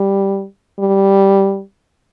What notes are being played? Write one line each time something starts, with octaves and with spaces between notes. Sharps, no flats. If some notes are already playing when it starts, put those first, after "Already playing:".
Already playing: G3
G3